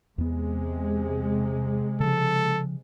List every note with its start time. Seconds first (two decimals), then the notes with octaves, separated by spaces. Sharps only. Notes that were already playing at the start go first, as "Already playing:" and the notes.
0.18 E2 C3 G#3 B3
2.00 C#3 F3 A4